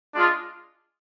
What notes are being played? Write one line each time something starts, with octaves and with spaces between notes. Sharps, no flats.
G#3 D4 F4